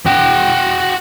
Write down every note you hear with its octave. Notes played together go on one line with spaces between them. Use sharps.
F#4 G5